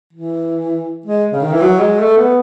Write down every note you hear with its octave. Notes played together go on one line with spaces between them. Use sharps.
E3
G#3
C#3
D#3
E3
F#3
G#3
A3
B3